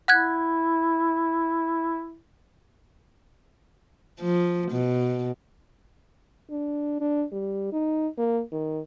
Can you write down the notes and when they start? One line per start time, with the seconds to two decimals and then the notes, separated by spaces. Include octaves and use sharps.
0.08 E4 F#5 F#6 G#6
4.21 F3
4.71 B2
6.51 D4
7.00 D4
7.32 G3
7.72 D#4
8.18 A#3
8.52 D#3